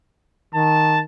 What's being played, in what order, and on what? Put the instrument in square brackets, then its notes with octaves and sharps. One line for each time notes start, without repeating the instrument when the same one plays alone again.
[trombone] D#3 [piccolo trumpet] A5